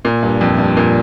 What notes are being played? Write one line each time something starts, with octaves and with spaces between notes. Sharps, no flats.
A#2
G2
F2
G2
A#2